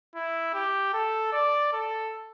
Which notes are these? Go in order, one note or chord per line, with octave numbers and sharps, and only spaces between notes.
E4
G4
A4
D5
A4